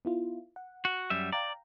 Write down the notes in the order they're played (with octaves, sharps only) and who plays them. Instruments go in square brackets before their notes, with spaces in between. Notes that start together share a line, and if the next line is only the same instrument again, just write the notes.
[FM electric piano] B3 E4 F4
F#5
[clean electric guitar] F#4
F#2 G3 E5
[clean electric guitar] D5 [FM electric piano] F5 G5 A#5